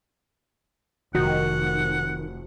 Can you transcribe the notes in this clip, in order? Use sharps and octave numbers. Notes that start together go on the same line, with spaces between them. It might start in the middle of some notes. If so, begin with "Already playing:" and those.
F1 D#3 F#4 F#5